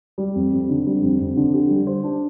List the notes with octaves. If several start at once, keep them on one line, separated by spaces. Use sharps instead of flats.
G3
F2
F2
D3
G3
F2
F2
D3
G4
G3
C5
D4